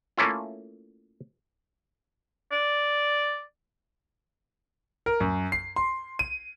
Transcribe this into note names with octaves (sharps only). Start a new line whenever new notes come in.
A3 A#3 C#4 E4 F4
D5
A#4
F#2
C7
C6
D#7